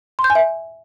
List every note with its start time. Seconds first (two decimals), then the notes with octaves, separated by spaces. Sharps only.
0.19 C6
0.24 G6
0.30 G#5
0.35 E5